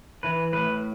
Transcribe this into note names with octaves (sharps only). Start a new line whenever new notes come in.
E3 B4
A2 B4